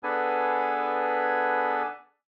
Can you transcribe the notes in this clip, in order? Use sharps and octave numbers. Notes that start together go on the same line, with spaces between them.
B3 D4 G#4 A4 B4 G#5